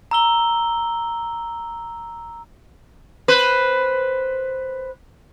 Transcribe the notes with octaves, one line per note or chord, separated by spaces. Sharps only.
A#5 E6 G7
B4 C5